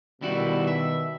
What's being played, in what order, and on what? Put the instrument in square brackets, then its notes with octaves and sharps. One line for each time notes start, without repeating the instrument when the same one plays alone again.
[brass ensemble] B2 D#3 [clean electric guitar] G3 E4 F#4
[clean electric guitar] E5